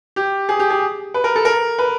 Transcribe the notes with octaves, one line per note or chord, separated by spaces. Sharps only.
G4
G#4
G4
G#4
B4
A#4
A4
A#4
B4